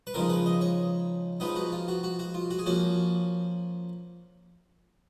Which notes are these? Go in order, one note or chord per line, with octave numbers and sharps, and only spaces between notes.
B4
C#3 F3 G#3 D#4 A#4
B4
D#5
C#5
F3 G#3 B3 D#4 B4
F#4
F4
F#4
F#4
F#4
F4
F#4
G#4
F3 A#3 C#4 F#4